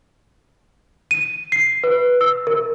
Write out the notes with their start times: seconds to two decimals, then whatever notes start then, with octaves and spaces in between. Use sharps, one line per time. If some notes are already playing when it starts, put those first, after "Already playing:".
1.11 D#7
1.52 C7
1.84 B4
2.21 E6
2.47 A#4